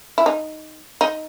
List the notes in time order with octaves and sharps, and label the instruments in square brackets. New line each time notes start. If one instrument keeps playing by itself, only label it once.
[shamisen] E4
D#4
D#4